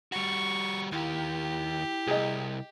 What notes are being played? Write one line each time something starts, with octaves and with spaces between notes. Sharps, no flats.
G3 F#4 C#6
D#2 E4 G4
C2 G#4 D#5